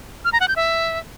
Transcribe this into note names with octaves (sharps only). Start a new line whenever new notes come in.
F6
A#5
F#5
G6
E5